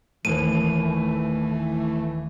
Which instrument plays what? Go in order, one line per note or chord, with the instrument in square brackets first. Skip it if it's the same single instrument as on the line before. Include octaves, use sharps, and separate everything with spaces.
[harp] E1 D#2 [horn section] E3 [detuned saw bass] A3 [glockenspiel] D#7